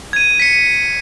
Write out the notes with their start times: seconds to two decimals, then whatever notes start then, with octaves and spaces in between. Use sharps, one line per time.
0.13 G#6 D#7
0.40 B6 C#7
0.53 D#7